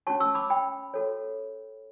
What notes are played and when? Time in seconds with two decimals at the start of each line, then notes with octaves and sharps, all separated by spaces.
0.07 C#4 F#4 C#5 A5 C#6
0.20 C#6 E6
0.35 B5 D6
0.50 G5 B5
0.94 F#4 A4 C#5